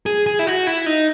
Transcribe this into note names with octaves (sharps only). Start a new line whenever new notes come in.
G#4
G#4
E4
F#4
E4
D#4